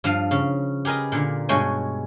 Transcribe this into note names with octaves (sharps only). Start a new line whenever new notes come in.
G2 F3 F5
C#3
G4 G#4 A#4 B4 D#5
A#2 D3
G2 B2 G#3 C#5 G5 G#5